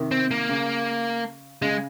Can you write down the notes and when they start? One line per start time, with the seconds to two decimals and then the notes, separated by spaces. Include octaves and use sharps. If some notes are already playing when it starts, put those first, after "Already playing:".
Already playing: C3 D#3
0.11 C4
0.31 A#3
0.49 C#3
1.62 C#3 G#3